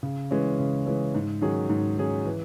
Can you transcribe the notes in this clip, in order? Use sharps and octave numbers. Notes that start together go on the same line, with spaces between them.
C#3
E3 G#3 C#4
C#3
E3 G#3 C#4
G#2
D#3 F#3 C#4 G#4
G#2
D#3 F#3 C#4 G#4
E3